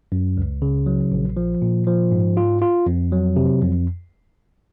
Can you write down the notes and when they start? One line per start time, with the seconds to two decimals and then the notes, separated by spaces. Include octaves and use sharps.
0.12 F#2
0.37 C#2
0.62 C#3
0.86 F#3
1.12 A#1
1.37 F3
1.62 A#2
1.87 F3
2.12 G#2
2.37 F4
2.62 F4
2.86 F2
3.12 F#3
3.36 C3
3.62 F2